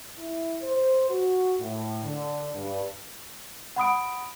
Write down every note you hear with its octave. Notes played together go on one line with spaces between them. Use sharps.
E4
C5
F#4
A2
D3
G2
F#5 B5 D#6 D7